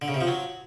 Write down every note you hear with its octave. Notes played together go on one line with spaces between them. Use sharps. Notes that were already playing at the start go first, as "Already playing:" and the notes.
D3
C#3
C3
F3
F#3